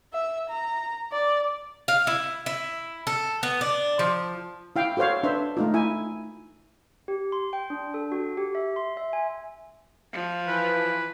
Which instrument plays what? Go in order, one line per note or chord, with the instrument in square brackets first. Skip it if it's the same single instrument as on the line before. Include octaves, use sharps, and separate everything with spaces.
[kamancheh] E5
A#5
D5
[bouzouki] F5
E4
E4
A4
B3
D4
F3
[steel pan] E4 F5 G5
F#4 A4 C5 C#5 F5
D4 B4 C5 E5
A3 D#4 F4
E4 G#5
[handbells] G4
C6
G5
D4
A4
F#4
G4
E5
C6
E5
G#5
[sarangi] F3
[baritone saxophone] E3 [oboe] B4